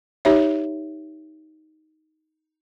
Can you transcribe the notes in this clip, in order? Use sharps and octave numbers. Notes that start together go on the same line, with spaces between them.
D#4 G4 C#5 E5